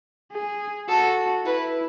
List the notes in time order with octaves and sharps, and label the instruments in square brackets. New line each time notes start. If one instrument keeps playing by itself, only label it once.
[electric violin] G#4
[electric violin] F#4 [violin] A4
[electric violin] E4 [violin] B4